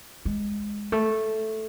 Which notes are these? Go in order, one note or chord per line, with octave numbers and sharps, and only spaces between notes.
G#3
A3